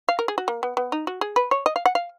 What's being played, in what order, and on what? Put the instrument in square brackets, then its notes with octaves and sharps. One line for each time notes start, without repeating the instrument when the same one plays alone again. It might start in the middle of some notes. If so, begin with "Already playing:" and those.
[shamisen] F5
A#4
G#4
F#4
A#3
B3
B3
D#4
F#4
G#4
B4
C#5
D#5
F5
F#5
F5